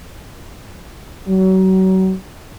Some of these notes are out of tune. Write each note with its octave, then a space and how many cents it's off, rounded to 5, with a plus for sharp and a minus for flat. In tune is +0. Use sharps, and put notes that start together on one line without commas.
F#3 +30